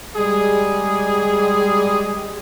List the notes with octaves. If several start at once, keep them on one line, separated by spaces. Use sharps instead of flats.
G3 G#3 G#4